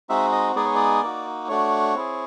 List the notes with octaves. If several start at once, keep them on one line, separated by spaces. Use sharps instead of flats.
G#3 C4 D#4 F#4 E5
D#5
G#3 B3 D#4 G#4 D5
C#5
D5
A#3 D#4 F#4
A3 D4 F#4 C#5
C4 E4 G#4